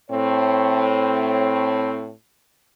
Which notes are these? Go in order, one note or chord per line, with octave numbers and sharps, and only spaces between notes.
A2 C4 C#5